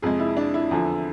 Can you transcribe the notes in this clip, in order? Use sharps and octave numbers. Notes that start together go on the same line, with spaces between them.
F2 C3 G#3 G#4
E4
D4
E4
E2 D3 F3